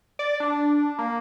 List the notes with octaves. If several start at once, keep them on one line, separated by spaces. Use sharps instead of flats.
D5
D4
A#3